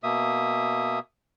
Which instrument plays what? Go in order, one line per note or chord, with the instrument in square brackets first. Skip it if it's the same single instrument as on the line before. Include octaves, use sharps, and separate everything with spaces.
[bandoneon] B2 A#3 E5 D#6